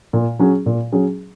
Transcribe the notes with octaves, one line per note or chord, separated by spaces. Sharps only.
A#2
F#3 C#4 G#4
A#2
F#3 C#4 G#4